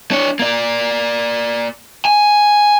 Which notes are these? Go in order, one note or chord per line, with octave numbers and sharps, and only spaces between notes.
D4 C#5
A#3 D5
G#5